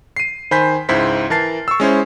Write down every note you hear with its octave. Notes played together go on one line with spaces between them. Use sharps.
C7 D#7
D#3 C5 G#5 B5 G6 B6
C#2 G#2 E4 C5 B6
E3 A#4 A5 A6 C7
C#6 E6
G#3 C#4 E4 C5